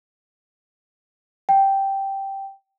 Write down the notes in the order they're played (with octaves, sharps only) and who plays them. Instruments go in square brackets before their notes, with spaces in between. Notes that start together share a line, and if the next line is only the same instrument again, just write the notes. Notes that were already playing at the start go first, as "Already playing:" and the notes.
[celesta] G5